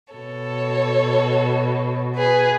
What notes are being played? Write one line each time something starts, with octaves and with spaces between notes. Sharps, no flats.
B2 A4 C#5
G#4 B4